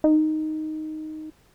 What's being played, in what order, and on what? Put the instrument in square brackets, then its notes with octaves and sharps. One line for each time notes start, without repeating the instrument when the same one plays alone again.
[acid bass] D#4